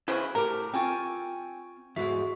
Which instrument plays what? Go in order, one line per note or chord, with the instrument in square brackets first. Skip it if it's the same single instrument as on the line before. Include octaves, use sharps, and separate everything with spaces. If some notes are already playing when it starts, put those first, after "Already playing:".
[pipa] C#3 E3 F#4 [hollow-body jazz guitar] E4 C5 C6
[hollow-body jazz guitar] A2 G4 [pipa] A#4
[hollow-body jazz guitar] C4 F4 [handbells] G5 G#5 C#6
[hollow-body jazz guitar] E2 G#2 G#3 [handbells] F#4 E5